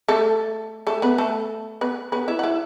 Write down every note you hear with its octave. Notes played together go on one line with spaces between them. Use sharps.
A3 A4
A3 A4
B3 B4
A3 A4
B3 B4
B3 B4
E4 E5
F#5
E4 E5